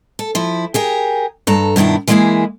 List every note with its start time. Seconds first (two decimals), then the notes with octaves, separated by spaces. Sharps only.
0.19 A4
0.35 F3 E4
0.74 G4 G#4 A#4
1.47 G2 A4 A#5
1.76 G2 B2 D#3 D4 E4
2.08 E3 G#3 A#3 D#4 E4 G#4